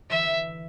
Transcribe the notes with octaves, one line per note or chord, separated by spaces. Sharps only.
D3 E3 E5